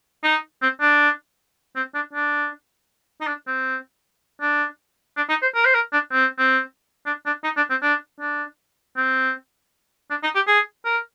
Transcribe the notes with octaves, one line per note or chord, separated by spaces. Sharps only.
D#4
C4
D4
C4
D4
D4
D#4
D4
C4
D4
D4
D#4
C5
A#4
C5
A#4
D4
C4
C4
D4
D4
D#4
D4
C4
D4
D4
C4
D4
D#4
G4
G#4
A#4